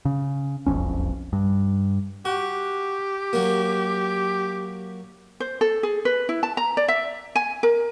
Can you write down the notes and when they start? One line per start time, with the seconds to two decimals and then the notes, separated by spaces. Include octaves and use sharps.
0.05 C#3
0.66 E1 B1 F2 C#4
1.33 G2
2.25 F#4 G4
3.33 F#3 A#3
5.40 C5
5.61 A4
5.83 G#4
6.05 B4
6.29 E4
6.43 A5
6.57 A#5
6.77 D5
6.88 E5
7.36 G#5
7.63 A#4